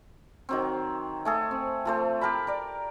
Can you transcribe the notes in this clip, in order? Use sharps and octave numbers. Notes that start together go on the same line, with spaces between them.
D#3 F#3 C4
A3 G#4 A4
C4
F3 A3 C5
G4 A#4 A5 B5
A#4 D5